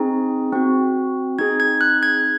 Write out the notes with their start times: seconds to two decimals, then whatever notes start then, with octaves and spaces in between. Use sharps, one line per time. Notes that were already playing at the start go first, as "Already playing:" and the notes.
Already playing: C4 D#4 G#4
0.53 C4 F#4
1.39 C4 D#4 G#4 G#6
1.60 G#6
1.81 F#6
2.03 G#6